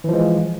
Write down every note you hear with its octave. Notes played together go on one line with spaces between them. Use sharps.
E3 F3 G#3